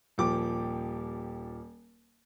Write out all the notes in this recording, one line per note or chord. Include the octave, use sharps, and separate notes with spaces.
D#1 F3 G4 D6